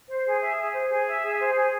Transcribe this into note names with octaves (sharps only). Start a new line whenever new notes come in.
C5
G#4
E5
G#4
C5
G#4
E5
G#4
C5
G#4